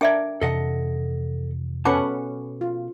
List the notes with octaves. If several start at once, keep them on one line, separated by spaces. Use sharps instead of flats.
D4 A#4 D5 E5 G5 D6
F2 C3 E3 A4 D#5 F#5
B2 C#4 A4 B4 F#5 A5 D6
F4